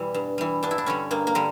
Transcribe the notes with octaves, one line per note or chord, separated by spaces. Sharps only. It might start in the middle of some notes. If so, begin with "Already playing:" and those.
Already playing: E2 B2 E3 G3
G2
E3 G3
G2 D4
E4
D4
D3 G3 C#4
G2 A#3
A#3
D3 G3